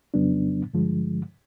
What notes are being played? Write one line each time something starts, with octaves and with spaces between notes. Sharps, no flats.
F2 C#3 F#3 B3 D4
G2 D3 F3 G#3